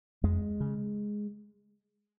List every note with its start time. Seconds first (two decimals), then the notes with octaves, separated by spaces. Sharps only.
0.23 F2 G#3
0.60 C#3